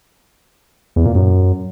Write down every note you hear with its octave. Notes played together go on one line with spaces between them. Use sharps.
E2
A#2
F#2